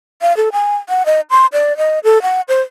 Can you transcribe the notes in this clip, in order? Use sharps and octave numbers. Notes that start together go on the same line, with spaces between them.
F5
A4
G#5
F#5
D#5
C6
D5
D#5
A4
F#5
C5